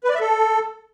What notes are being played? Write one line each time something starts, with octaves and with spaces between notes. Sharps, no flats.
B4
D5
E5
A4